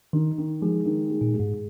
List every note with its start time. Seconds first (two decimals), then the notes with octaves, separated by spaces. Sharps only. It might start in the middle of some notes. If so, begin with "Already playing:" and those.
0.13 D#3 D#4
0.38 D#3
0.62 F3 G#3
0.86 D#3
1.10 G#3
1.21 A#2
1.34 G#3
1.40 G#2